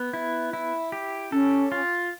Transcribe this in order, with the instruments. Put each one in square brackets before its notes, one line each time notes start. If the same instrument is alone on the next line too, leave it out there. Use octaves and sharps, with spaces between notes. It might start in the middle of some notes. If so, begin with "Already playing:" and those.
Already playing: [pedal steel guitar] B3
E4
E4
G4
[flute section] C#4 [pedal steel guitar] A4
[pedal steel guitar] F4